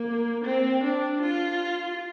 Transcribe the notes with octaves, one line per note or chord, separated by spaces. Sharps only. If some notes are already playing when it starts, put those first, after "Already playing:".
Already playing: A#3
C4
D4
F4